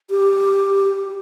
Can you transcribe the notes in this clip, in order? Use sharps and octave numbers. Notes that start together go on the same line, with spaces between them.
G4